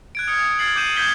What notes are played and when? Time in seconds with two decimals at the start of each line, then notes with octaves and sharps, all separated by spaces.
0.15 F#6 G#6 D7
0.27 D#6 F6 F#6 G#6 C#7
0.59 F6 G#6 A6 C7 F#7
0.76 D6 G6 D#7 E7 F#7
0.97 G6 G#6 B6 G7